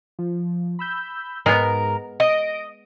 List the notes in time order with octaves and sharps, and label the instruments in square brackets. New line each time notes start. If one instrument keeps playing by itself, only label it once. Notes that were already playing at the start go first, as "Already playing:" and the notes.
[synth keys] F3
B5 E6 G6
[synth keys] G#2 A#5 [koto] G#3 B3 [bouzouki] A#4
[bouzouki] D#5 [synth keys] A#6 D7